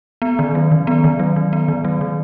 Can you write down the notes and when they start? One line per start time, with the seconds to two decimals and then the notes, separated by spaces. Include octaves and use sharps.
0.22 B3
0.39 D#3
0.55 F#3
0.72 D#3
0.87 B3
1.04 D#3
1.19 F#3
1.36 D#3
1.53 B3
1.68 D#3
1.85 F#3
2.01 D#3